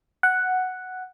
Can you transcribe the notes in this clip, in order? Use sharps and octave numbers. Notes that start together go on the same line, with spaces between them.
F#5